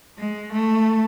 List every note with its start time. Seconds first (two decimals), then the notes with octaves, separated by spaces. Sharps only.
0.18 G#3
0.52 A3